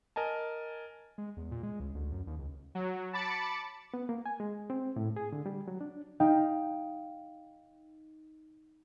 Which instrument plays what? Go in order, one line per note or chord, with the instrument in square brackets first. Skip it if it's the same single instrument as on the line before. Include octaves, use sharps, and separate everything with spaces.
[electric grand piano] A#4 D#5 G#5 A5
[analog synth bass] G#3
E2
A#2
G#3
C#2
D2
F#2
D#2
C#2
[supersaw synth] F#3
A5 B5 D6 A6 C#7
[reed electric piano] B3
A#3
G#5
G#3
C4
A2
G#4
D3
G3
F#3
D4
[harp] D#4 F5 G5